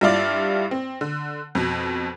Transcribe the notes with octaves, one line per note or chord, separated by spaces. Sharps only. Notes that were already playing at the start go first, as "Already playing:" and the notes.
G2 G3 E4 F4 D5
C4
D3
F2 B2